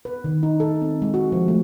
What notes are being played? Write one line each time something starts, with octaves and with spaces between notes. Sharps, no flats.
B4
D#3
D#4
A4
C4
G#3
F#4
F3
A3